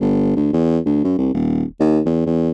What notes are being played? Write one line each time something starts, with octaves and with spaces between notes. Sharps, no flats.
G1
D2
E2
D2
F#2
C2
D#1
D#2
E2
E2